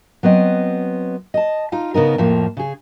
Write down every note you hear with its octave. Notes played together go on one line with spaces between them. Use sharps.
F#3 B3 C4 D#5
D#5 A5
D#4 F4 F5
C#3 B3 D#4 A#4
F2 A2 F3 A#3
C#3 G#4